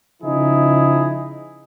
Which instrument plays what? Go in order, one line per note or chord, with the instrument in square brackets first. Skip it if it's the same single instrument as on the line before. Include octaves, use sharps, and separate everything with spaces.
[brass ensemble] C#3 F3 D#4 E4 G#4